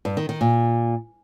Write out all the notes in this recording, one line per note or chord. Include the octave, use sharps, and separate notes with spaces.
G2
D#3
D#3
A#2